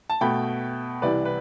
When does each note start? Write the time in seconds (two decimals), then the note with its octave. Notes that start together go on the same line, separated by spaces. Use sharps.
0.10 A5
0.21 B2 A3 G5 B5
1.02 C2 C3 E3 B4 D5
1.25 B4